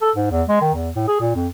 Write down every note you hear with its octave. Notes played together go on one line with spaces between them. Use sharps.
A4
G#2
E2
G#3
D#3
E2
A2
G#4
A#2
F2